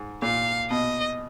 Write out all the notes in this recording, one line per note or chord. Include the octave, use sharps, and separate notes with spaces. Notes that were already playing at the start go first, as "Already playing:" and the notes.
Already playing: G#2
A#2 F5
B2 D#5